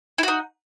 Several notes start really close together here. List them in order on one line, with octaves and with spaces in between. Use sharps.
E4 F#4 D#4